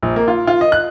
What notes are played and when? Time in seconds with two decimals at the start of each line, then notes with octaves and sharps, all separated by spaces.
0.03 A#1
0.16 A#3
0.28 F4
0.47 F4
0.61 D#5
0.72 F#6